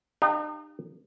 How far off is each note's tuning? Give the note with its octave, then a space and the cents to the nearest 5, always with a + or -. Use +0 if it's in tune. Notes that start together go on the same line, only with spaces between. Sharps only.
D#4 -45 G4 +15 F5 +0